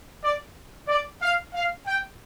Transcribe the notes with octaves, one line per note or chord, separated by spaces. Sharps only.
D5
D5
F5
F5
G5